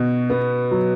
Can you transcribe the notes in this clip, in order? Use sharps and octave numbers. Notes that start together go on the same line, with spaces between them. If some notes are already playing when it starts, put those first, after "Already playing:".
Already playing: B2 F#4
B3
F#3